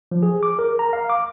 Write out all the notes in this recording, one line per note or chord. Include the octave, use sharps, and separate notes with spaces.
F3
G#4
D6
A#4
A#5
F5
D6